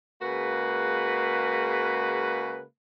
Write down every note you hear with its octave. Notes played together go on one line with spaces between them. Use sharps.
C#3 G#3 A#3 F#4 B4